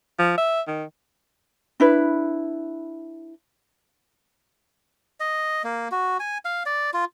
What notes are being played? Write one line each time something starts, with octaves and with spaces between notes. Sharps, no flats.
F3
E5
D#3
D4 E4 B4
D#5
A#3
F#4
G#5
F5
D5
F4